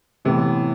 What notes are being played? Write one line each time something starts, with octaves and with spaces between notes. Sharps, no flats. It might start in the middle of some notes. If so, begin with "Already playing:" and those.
A2 C3 E3 B3